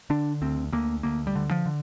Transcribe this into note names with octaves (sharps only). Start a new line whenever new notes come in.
D3 D4
D2 C4
D2 A#3
D2 A#3
G3
D3
F3
D3